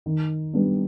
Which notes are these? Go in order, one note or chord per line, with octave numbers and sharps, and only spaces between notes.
D#3
G3 B3 D4